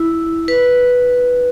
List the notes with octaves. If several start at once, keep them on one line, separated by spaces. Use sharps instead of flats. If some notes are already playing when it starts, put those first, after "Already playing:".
Already playing: E4
B4